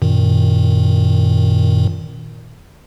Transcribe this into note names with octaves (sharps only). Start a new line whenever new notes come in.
F#2 A#2 D#3